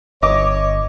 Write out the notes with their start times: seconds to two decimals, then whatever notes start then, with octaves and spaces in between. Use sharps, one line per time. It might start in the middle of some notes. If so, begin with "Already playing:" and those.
0.23 G1 C#5 D#5 D6